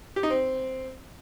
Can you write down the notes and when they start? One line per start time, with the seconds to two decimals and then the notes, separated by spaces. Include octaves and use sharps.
0.16 G4
0.23 D#4
0.30 C4